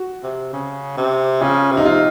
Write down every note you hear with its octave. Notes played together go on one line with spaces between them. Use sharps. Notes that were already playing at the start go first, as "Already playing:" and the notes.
Already playing: F#4
C3
C#3
C3
C#3 F4
C3
D#4
F4